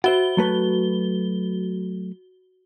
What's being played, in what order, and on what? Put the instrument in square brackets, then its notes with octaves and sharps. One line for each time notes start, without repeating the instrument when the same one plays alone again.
[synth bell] F#4 G7 [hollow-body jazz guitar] C5 E5 F#5
[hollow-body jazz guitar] F#3 A3 B4